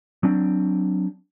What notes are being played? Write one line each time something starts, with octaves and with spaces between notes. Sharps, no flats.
F#3 C4 D4